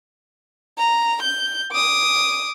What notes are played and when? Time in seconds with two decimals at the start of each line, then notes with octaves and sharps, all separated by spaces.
0.78 A#5
1.22 G6
1.72 D6 D#6